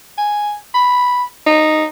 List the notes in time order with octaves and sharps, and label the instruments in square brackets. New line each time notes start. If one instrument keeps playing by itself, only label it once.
[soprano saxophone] G#5
B5
D#4